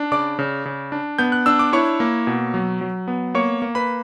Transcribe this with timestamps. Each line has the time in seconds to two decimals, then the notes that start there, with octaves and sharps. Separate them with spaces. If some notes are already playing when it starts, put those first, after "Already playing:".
Already playing: D4
0.12 C#3 D5 D6
0.39 C#3
0.65 C#3
0.92 D4
1.19 B3 G6
1.32 F#6
1.46 D4 E6
1.59 D6
1.73 E4 C#5 C#6
2.00 A#3
2.27 B2
2.54 F#3
2.81 F#3
3.08 B3
3.35 A#3 C#5 C#6
3.62 A#3
3.75 B4 B5